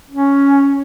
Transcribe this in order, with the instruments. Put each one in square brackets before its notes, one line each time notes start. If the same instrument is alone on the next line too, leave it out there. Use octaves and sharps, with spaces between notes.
[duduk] C#4